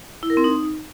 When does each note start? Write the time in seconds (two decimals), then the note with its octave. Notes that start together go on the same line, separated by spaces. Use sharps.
0.23 E4
0.30 A#4
0.37 C4
0.44 D#4